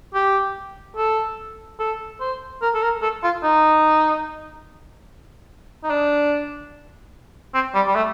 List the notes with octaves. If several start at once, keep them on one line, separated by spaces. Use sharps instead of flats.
G4
A4
A4
C5
A#4
A4
A#4
A4
F4
D#4
D#4
D4
C4
G3
G3
A3